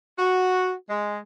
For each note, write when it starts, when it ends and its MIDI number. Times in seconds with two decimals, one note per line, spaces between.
0.18 0.72 66
0.89 1.19 56